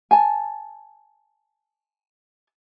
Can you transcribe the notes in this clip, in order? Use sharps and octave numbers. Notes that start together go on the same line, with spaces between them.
G#5 A5